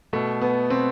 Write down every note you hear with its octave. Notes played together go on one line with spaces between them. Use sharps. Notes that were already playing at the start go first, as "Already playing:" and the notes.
B2 A3
B3
B2 C4